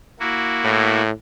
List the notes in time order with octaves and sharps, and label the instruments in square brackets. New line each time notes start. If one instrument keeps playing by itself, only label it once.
[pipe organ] A#3 E4 F#4
[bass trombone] A2